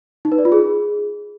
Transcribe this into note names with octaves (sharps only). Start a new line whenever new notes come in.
D#4
B4
D5
F4
G#4